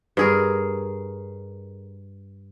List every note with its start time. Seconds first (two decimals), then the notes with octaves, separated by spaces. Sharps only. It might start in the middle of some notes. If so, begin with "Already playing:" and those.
0.17 G2 G#4 A#4